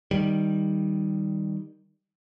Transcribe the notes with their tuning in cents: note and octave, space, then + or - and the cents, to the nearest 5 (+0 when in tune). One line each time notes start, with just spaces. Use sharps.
D#3 +0 G3 +0